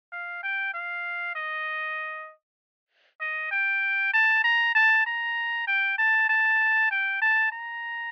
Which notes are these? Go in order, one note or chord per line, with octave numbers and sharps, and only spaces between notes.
F5
G5
F5
D#5
D#5
G5
A5
A#5
A5
A#5
G5
A5
A5
G5
A5
A#5